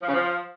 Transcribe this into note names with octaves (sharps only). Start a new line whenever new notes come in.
F3
C#3
F3